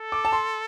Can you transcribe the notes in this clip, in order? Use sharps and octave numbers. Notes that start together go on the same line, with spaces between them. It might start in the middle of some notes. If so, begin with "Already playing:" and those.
Already playing: A4
D6
A5
C6